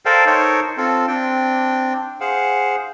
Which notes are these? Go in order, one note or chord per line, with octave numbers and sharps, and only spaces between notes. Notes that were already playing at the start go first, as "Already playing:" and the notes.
A4 A#4 C5 D5 F5 G5
D#4 A4 A#4 C5 C#5
C4 F4 A4
C4 D4 G5
G#4 C5 F5 F#5